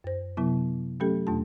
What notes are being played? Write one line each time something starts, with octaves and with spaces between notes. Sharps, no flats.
F#2 C5
C3 F#3 B3 E4
F#3 A3 C#4 G4 A4
E2 B2 A3 D4 F4 A5